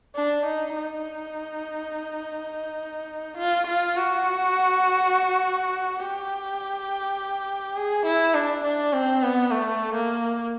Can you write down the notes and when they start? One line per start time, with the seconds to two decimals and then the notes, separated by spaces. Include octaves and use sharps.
0.16 D4
0.46 D#4
0.76 D#4
3.38 F4
3.67 F4
3.97 F#4
6.00 G4
7.77 G#4
8.06 E4
8.34 D4
8.64 D4
8.93 C4
9.23 B3
9.51 A3
9.95 A#3